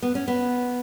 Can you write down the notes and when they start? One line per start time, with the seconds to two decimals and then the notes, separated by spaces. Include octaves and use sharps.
0.02 B3
0.15 C#4
0.28 B3